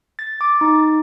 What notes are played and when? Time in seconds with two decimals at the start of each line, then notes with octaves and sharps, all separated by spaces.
0.19 A6
0.41 D6
0.61 D#4